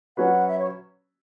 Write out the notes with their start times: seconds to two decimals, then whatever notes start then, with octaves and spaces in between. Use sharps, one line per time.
0.17 F#3 C#4 F#4 B4 F#5
0.47 E5
0.58 C#5